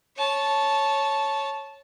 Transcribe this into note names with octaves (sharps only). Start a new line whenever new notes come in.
C#5 A5